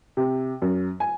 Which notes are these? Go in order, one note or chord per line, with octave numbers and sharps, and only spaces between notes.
C3
F#2
G#5